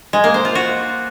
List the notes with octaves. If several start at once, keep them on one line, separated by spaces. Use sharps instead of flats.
G#3
A#3
C5
F4
F#4